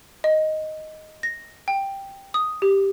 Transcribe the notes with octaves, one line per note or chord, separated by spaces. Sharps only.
D#5
A#6
G5
D#6
G4